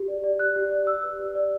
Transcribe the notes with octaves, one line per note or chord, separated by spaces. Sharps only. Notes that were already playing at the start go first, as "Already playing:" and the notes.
Already playing: G4
D5
D5
G4 F#6
G4
D5
G4 E6
B4
G4
D5